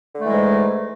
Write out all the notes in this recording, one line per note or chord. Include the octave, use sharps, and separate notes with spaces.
G#2 D3 E3 G#3 A3